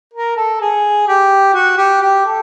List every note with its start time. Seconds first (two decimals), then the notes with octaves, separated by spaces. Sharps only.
0.14 A#4
0.36 A4
0.61 G#4
1.08 G4
1.54 F#4
1.78 G4
2.01 G4
2.26 A4